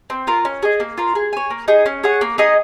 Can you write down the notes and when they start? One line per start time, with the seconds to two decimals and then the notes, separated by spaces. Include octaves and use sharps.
0.10 C4
0.27 F4 A#4
0.45 C#4
0.63 G#4 D#5
0.80 A#3
0.98 F4 A#4
1.15 G#4
1.33 C#5 G#5
1.50 A#3
1.68 D#4 G#4
1.86 C#4
2.04 G#4 C#5 F#5
2.21 A#3
2.38 D#4 G#4 D#5